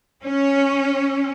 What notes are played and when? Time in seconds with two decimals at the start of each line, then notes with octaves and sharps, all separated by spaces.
0.23 C#4